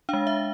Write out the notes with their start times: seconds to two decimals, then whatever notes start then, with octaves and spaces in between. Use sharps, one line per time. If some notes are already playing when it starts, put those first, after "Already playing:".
0.09 G#3 D4 F5
0.27 E5